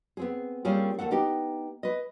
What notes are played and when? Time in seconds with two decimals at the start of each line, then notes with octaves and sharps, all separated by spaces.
0.17 B3 C4 G#4
0.65 G3 A#3 C4 C#4 F4 G#4
0.99 D#2 G#2 A3 A4 F#5
1.11 B3 D#4 G4
1.83 B4 D#5